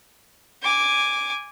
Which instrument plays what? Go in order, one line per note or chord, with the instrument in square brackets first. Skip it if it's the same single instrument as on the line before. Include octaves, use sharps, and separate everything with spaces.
[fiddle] G#5 D6